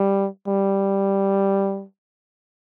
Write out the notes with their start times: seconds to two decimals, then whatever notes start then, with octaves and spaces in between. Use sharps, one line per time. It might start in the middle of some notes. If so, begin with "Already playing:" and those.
Already playing: G3
0.47 G3